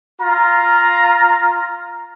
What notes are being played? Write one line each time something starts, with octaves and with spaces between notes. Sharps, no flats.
F4 A#5